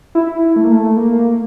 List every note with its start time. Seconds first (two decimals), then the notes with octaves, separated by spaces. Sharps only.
0.15 E4
0.56 A3
0.64 A#3
0.72 A3
0.97 A#3